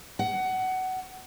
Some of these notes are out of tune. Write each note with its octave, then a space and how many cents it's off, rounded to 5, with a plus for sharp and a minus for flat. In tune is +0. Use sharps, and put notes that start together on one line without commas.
F#5 +20